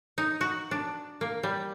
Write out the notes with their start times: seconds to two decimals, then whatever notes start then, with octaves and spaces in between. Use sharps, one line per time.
0.18 D#4
0.41 F#4
0.71 D4
1.21 A#3
1.43 G3